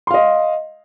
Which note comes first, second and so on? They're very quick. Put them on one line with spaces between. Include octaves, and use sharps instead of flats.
C6 F5 D#5